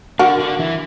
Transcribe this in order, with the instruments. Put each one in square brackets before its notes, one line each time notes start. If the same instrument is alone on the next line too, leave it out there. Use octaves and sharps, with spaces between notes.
[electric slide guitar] D3 D4 [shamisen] F#4 A#4
[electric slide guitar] D3 D4
E3 E4